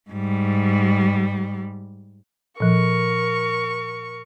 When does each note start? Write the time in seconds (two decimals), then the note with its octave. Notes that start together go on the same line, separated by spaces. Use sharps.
0.10 G#2 G3
2.60 A#2 F3 A#4 C#6